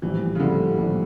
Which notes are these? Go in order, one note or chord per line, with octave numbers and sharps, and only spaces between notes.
A#1 A2 E3 G3
C#3
A#1 A2 D3 G3
A#1 A2 G3